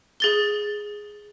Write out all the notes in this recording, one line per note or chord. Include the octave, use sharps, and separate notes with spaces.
G#4 A6 G7